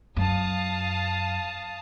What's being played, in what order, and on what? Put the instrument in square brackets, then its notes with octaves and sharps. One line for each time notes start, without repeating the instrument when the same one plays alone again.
[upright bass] F#2 [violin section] F5 A5 D#6